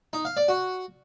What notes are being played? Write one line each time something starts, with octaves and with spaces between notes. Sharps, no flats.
D#4
F5
D5
F#4